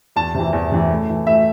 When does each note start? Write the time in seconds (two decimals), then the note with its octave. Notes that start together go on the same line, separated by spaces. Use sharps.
0.16 E2 A5
0.34 C3 E3
0.53 E2
0.72 C3 E3
0.91 A2
1.09 E3
1.27 A2 E5